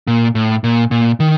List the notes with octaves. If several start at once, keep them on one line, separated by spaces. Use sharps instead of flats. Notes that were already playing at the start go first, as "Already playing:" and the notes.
A#2
A2
A#2
A#2
D#3